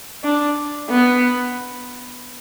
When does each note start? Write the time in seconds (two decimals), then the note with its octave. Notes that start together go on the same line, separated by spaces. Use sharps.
0.24 D4
0.89 B3